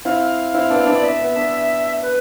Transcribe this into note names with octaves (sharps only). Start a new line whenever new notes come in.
C4 E4 F5
C4 E4
B3 D4
B3 D4
D5
E5
B3
B3 D4
B4